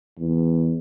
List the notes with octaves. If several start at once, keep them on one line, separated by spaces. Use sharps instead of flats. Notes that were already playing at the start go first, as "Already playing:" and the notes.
E2